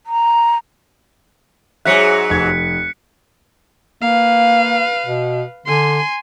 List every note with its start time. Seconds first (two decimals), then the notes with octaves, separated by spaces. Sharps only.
0.06 A#5
1.85 G#2 F#3 G#4 C#5 E5 F#6 B6 C#7
2.30 F1 G#6
4.02 A#3 B4 F5
5.06 B2
5.66 D3 G#5 C6